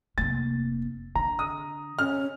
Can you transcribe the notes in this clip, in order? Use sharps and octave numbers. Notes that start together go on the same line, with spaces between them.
F1 A#3 A6
D3 A#5
D#6
C#4 F6